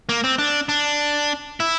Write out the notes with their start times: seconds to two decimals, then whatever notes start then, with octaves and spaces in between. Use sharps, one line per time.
0.09 A#3
0.24 C4
0.39 D4
0.69 D4
1.60 E4